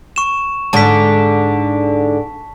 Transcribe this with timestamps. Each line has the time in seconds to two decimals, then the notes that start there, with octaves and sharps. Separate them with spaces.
0.16 C#6 E7
0.73 G#2 D3 A5 B6